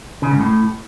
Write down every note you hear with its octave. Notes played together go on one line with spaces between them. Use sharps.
C#3
G#2
A2